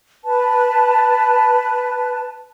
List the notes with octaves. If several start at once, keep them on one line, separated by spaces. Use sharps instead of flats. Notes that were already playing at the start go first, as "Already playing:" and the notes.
B4 A5